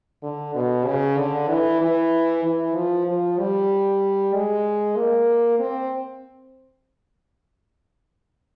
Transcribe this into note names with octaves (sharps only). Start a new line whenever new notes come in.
D3
B2
C#3
D3
E3
E3
E3
F3
F3
G3
G#3
A#3
C4